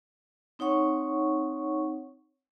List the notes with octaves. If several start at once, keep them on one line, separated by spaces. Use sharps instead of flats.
C4 D#4 C#5 F#5 C#6